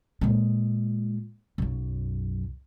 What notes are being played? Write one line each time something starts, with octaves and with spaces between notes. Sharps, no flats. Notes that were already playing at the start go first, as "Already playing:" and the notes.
A#2 G#3
B1 F#2